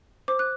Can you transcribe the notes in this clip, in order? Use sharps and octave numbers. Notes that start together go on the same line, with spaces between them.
C5 D6
F#6